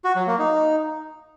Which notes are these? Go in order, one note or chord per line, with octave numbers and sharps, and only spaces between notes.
F#4
F#3
A#3
D#4